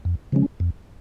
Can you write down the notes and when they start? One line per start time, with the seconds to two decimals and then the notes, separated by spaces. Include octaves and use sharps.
0.05 F2
0.32 C#3 F3 G#3 C#4
0.60 F2